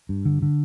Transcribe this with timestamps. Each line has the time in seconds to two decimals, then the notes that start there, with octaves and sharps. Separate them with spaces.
0.09 G2
0.25 D3
0.42 D3